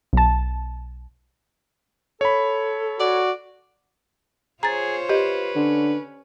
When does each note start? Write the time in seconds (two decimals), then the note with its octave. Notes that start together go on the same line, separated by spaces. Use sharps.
0.13 B1 A5
2.21 A4 C#5 B5
3.00 F#4 D5
4.63 F4 G#4 C5 C#5 A#5 A6
5.09 G4 B4 D#5
5.56 D3 C#4